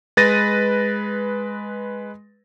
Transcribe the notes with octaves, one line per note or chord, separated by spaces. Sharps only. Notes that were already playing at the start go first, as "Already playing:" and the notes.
G#3 B4 A6 A#6 D#7